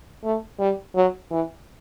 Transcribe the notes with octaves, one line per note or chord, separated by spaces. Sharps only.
A3
G3
F#3
E3